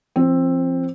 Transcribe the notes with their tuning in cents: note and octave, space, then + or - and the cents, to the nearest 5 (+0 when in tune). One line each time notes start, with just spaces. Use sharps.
F3 -35 C4 +15